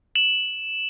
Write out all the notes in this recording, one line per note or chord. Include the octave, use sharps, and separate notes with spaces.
E7 F#7